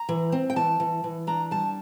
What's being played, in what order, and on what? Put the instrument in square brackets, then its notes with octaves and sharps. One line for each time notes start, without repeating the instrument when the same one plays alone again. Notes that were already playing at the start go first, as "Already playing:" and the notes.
Already playing: [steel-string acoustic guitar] A#5
E3
C4
G5
E3 A5
E3
E3
D4 A#5
G3 A5